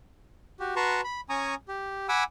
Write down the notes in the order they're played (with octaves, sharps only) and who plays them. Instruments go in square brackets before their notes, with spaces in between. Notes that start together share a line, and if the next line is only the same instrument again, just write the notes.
[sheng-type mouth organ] F#4 G4
F#4 B4 A5 A#5 C6 C#6
B5
C#4 G#5 A#5 C#6 D#6
G4
F#5 G#5 B5 D6 E6